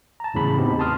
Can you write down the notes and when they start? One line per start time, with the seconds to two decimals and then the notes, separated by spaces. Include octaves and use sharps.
0.20 A5 A#5
0.34 E2 A2 C#3 B5
0.58 B3 C4 D#4 G4
0.79 A5 C6 D#6 F6